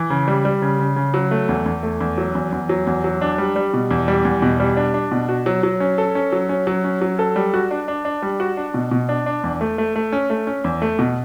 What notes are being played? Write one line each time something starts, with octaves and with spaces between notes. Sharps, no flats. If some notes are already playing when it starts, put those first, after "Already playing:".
Already playing: E3
C#3
G3
G3
C#3
C#3
C#3
F#3
A3
E2
E2
A3
E2
F#3
E2
E2
F#3
E2
F#3
D4
G3
G3
B2
E2
G3
E2
B2
G3
D4
D4
B2
F#4
F#3
F#3
C#4
A4
C#4
F#3
C#4
F#3
C#4
F#3
A4
G3
F#4
D4
D4
D4
G3
F#4
D4
B2
B2
D4
D4
E2
A3
A3
A3
C#4
A3
C#4
E2
A3
B2